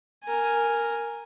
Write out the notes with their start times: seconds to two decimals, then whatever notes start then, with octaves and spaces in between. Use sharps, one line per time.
0.24 A#4 G#5